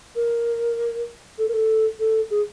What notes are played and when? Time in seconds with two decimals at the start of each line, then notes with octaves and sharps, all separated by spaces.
0.16 A#4
1.38 A4
1.48 A#4
1.53 A4
2.00 A4
2.31 G#4